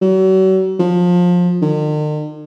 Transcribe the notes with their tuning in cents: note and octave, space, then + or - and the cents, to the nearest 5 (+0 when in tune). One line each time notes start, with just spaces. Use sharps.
F#3 +40
F3 +25
D#3 -45